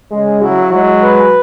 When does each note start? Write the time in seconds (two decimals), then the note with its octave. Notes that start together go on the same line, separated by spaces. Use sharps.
0.11 C#3 G#3
0.41 F#3 E4
0.72 F#3 G#3
1.03 B4